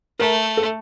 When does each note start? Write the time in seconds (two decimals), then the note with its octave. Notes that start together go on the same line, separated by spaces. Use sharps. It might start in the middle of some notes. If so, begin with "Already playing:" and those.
0.19 A3 A#4
0.57 A4